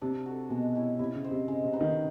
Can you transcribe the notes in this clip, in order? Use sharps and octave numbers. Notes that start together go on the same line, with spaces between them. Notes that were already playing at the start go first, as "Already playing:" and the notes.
C3 D4
F#4 A4
B2 G#3
C#4 E4 G4
C3 E4
C#3
G4 C5 D#5
C3
C#3 G#3
C3
B3 D#4 F#4
D#3